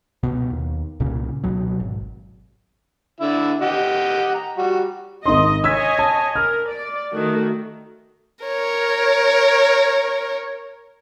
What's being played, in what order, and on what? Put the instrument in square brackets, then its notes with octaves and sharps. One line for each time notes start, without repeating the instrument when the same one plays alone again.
[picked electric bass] C#2 B2 B3
D#2
C2 A#2 C#3 C#4
C#2 B2 F#3
G#1
[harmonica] D3 E4
G4 D#5 F#5
A#5
G3 F#4
[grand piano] G#1 D#4 C6 [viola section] D#5
[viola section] C#5 D#5 G#5 [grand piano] E6 G#6 B6
[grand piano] A5
[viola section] A#4 [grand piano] F6
[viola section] D5
D#3 A3 F#4
[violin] A#4 C#5